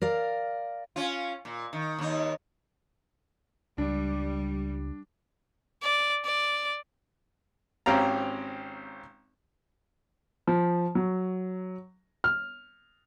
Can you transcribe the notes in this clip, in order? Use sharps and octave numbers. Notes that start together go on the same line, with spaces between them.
A#4 D5 F5
C#4 F4
A#2
D#3
D#2 D#4
C#2 G3 D4
D5
D5
G#1 C4 C#4 G4 F5 A#5
F3
F#3
F6